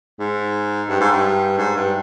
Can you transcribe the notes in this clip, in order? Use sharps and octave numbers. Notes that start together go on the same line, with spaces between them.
G#2
G2
G#2
G2
G#2
G2